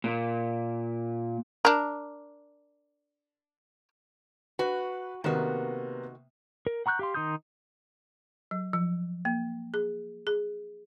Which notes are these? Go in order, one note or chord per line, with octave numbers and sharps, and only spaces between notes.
A#2
D4 A#4
F#4 B4
C3 D#3 A#3 B3 F#4
A#4
F#5 A#5 C#6 F#6 G6
G4 F5 C6
D#3 D#4 C6 D#6 G6
F#3
F3
A#3
G#4
G#4